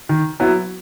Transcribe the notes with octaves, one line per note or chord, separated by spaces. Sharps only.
D#3
F#3 B3 E4